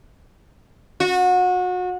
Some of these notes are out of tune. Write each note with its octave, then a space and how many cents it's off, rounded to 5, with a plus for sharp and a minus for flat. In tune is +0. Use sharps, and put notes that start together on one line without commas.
F#4 -30